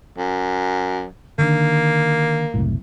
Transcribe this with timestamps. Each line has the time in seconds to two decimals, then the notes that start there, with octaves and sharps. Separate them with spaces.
0.18 F#2
1.38 D3 D#3 A#3 D4
2.54 F#1 C2 A2